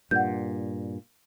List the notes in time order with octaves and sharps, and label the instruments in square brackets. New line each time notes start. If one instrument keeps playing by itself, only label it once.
[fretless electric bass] G2 A#2 [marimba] F#5 G6